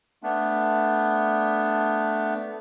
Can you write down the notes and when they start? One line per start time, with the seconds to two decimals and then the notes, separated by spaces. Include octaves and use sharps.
0.23 A3 B3 D4